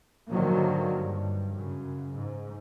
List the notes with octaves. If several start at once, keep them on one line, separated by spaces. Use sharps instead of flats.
G#2 D3 D#3 F3 F#3 A#3
G2
F#2 C#3
G#2